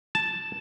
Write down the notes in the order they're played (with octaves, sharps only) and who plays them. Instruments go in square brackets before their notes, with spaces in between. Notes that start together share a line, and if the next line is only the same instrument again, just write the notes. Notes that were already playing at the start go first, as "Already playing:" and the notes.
[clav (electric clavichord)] A5